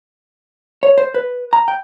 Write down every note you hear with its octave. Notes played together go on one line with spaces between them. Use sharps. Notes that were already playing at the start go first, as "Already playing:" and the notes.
C#5
C5
B4
A#5
G5